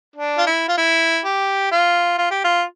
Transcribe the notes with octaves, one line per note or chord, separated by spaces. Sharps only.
D4
F4
E4
F4
E4
G4
F4
F4
G4
F4